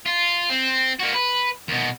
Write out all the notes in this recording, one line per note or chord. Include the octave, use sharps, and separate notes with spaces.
F4
C4
A#3 F#4
B4
D#2 B2